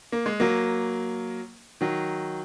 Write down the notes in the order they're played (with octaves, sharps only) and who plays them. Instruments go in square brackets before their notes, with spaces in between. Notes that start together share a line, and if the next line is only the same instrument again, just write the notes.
[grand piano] A#3
G#3
F#3 A#3
D#3 F#3